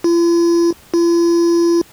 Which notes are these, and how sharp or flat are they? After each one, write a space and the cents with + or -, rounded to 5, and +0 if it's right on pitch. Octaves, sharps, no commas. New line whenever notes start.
F4 -45
F4 -45